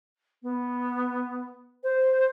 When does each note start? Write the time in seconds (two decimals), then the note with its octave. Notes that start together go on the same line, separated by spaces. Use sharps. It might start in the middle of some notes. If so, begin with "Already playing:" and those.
0.43 B3
1.84 C5